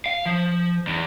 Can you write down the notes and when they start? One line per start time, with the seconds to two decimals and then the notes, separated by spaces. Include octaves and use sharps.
0.06 F5
0.26 F3
0.87 E2